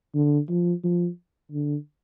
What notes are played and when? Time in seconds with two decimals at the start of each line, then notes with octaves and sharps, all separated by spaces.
0.15 D3
0.49 F3
0.84 F3
1.52 D3